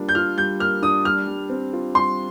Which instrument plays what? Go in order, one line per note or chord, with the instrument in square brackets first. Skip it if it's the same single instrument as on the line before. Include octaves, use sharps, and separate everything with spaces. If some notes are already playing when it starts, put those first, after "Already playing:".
Already playing: [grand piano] G3 A#3 D4 F4
[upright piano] G6
[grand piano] F4 [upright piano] F6
[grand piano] G3 [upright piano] G6
[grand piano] A#3 [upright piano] F6
[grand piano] D4 [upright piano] D#6
[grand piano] G3 [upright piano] F6
[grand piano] G3
C4
F4
[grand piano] G3 [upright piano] C6